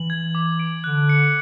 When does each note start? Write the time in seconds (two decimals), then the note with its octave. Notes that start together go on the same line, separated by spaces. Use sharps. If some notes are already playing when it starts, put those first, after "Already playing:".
Already playing: E3 F#7
0.10 G#6
0.35 D6
0.59 D7
0.84 D3 F#6
1.09 C#7